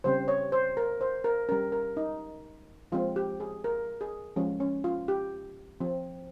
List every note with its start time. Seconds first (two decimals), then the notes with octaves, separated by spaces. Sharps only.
0.04 C#3 G3 C4 C5
0.28 C#5
0.52 C5
0.77 A#4
1.01 C5
1.24 A#4
1.49 G3 C#4 A#4
1.72 A#4
1.97 D#4
2.92 F3 G#3 C4 F4
3.16 G4
3.40 G#4
3.64 A#4
4.01 G#4
4.36 F3 G#3 C#4
4.60 C#4
4.84 F4
5.08 G4
5.81 F3 C4